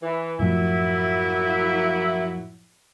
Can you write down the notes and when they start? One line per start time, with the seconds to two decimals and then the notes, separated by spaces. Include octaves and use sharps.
0.03 E3
0.39 F#2 A2 F3 F#3 A#3 E4